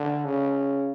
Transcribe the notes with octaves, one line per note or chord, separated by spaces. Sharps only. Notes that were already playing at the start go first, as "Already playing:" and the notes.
Already playing: D3
C#3